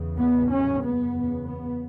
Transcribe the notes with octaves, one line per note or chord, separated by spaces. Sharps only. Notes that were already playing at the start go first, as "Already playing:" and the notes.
Already playing: E2 C#3
B3
F#2 C#3 C#4
B3
E2 C#3
B3